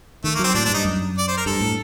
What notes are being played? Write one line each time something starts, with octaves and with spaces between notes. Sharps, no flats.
D#3 A3
A#3
F#3 C4
A2 D4
D4
G2 D#4
F#2
D5
C5
A#4
G2 A4
A2